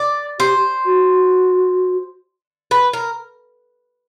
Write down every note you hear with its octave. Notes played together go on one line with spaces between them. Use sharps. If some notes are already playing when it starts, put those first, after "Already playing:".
Already playing: D5
G4 C5
F#4
B4
A#4